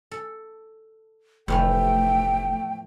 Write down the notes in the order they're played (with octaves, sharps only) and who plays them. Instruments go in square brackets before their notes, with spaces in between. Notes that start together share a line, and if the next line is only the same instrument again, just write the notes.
[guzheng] A4
[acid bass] F1 [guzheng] E2 A2 F3 [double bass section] A3 [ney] G5